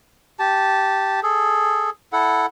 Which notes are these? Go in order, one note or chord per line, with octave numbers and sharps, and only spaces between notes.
G4 A5
G#4 A4
E4 A4 F#5